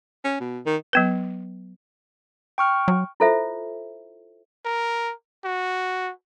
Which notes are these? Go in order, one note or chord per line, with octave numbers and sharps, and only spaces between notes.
C#4
B2
D#3
F#3 B3 B4
G5 C#6 F6
F#3
E4 F4 A4 C5 E5
A#4
F#4